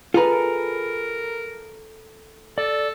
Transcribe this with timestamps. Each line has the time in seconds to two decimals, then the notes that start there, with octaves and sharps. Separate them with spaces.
0.14 F4 G#4 A4 B4 A#5
0.32 A#4
2.58 A4 D5